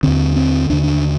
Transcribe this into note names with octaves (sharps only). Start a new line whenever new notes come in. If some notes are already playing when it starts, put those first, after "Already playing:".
D#2 D3 C4
C4
D#2 D3 D4
D4